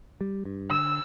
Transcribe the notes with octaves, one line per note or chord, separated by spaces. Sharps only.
G3
G2
D3 E6